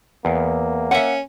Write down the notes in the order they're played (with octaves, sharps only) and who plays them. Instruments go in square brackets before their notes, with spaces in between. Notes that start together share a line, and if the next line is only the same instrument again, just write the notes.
[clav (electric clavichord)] E2 [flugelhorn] A#3
[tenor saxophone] C#4 [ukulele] E5 F#5